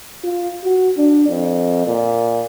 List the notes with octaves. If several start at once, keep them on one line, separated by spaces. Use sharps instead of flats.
F4
F#4
D4
F2
A#2